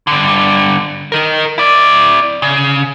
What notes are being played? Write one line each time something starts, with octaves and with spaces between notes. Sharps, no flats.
G2 D3
D#4 A#4
E4 D5
C#3